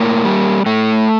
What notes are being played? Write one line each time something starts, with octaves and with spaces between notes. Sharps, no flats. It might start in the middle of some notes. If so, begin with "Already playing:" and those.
Already playing: A2 A#3
G3
A2 A3